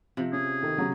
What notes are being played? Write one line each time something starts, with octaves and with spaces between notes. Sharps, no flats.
C3 F3
C#4 G#4
D#3 A4
C#3 F#3